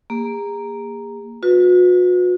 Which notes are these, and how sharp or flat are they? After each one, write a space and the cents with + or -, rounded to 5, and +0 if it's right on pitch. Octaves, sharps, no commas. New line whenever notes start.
A#3 +0 G#4 -40
F#4 -40 B4 +0